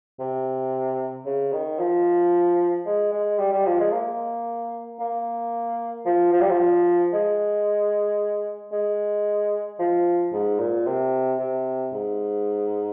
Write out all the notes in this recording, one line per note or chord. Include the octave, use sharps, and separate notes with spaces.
C3
C#3
D#3
F3
G#3
G#3
G3
G3
F3
G#3
A#3
A#3
F3
F3
G3
F3
G#3
G#3
F3
G#2
A#2
C3
C3
G#2